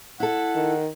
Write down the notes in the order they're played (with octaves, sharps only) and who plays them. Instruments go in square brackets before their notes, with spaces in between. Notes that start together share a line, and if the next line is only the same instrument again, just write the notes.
[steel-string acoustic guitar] E4 A4 [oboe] F#5
[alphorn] D#3